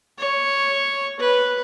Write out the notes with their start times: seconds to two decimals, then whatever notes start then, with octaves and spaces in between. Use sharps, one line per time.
0.18 C#5
1.19 B4